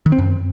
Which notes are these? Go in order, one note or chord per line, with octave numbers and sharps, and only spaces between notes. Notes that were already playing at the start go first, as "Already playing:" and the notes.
D#3
C4
F#2